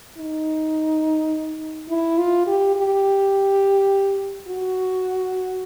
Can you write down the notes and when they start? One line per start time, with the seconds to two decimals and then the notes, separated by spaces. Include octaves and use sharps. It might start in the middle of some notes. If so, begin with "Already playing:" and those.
0.18 D#4
1.89 E4
2.18 F4
2.47 G4
2.76 G4
4.48 F#4